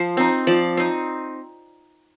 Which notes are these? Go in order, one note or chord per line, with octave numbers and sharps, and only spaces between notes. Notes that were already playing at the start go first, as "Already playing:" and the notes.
Already playing: F3 C5
C4 D#4
F3 D5
C4 D#4